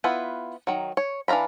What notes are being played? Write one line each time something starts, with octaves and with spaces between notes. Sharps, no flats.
B3 E4 F4 B4
D#3 F#3
C#5
E3 D4 F5 A#5 B5